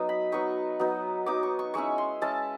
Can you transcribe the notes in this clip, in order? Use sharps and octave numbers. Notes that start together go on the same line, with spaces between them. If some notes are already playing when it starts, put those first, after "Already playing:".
Already playing: F#3 B3 D#4
B5
F#3 B3 D#4 C#6
F#3 B3 D#4
F#3 B3 D#4 D6
C#6
C#6
G#3 C#4 E4 C#6
C6
G#3 C#4 E4 A5